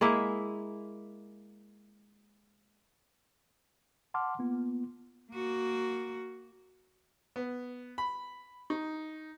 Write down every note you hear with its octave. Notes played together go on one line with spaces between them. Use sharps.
G#3 A#3 E4 E5
F#5 A5 C6 D6 F6
A#3 B3 F4
A#3 F#4
B3
B5
D#4